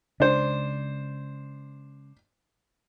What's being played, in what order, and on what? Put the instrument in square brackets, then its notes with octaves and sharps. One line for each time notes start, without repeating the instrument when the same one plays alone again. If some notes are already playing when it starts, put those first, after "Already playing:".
[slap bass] C#3 G#3 [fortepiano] D4 C5